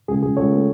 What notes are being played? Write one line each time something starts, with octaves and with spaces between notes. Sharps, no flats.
C#2 G#4
C#2 G#4
C#2 A4 C#5
A3